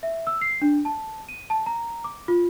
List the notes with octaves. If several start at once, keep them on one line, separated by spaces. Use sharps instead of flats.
E5
E6
C7
D4
A5
D#7
A5
A#5
D6
F4